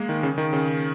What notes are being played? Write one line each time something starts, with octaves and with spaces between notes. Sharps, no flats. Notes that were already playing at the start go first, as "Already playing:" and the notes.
Already playing: G#3 A#3
D#3
C#3
D#3
C#3